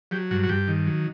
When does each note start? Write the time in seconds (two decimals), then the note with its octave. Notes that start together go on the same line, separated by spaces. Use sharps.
0.11 F#3 G4
0.31 G2 F#4
0.43 F#4
0.49 G2 G4
0.68 D#3
0.87 F#3